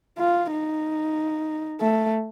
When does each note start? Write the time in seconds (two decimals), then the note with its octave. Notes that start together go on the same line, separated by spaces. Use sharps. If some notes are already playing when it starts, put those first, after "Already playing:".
0.18 F4
0.51 D#4
1.81 A3